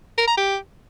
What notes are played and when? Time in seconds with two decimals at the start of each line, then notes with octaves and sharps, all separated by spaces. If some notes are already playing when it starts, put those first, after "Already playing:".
0.18 A#4
0.28 A#5
0.37 G4